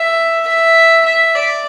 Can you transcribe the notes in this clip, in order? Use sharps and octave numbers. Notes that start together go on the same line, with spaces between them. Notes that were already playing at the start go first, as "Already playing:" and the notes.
Already playing: E5
E5
E5
D5